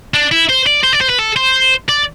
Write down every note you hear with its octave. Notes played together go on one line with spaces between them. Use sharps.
D4
E4
C5
D5
C5
D5
C5
B4
A4
C5
D5